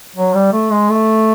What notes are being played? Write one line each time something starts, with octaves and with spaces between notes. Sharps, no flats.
F#3
G3
A3
G#3
A3